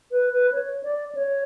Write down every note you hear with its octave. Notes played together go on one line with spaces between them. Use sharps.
B4
B4
C#5
D5
C#5